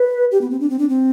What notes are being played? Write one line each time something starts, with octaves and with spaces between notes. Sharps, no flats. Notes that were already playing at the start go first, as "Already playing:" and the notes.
Already playing: B4
G4
B3
C4
D4
C4
D4
C4